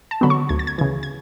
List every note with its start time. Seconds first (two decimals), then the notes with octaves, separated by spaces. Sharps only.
0.11 A5
0.21 D3 F#3 B3 B5
0.30 C#6
0.49 D2 G#6
0.59 A6
0.67 G#6
0.78 C#3 E3 G#6
1.03 G#6